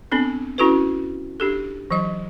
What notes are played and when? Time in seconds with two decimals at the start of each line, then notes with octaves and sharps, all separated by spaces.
0.12 B3 C4 D4 A4
0.58 C#4 E4 F#4 A4 B4
1.40 D4 G4 A4
1.91 E3 F#3 D#5